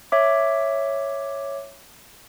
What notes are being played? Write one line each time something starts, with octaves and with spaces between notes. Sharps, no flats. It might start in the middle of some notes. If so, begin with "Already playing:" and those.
C#5 E5 D6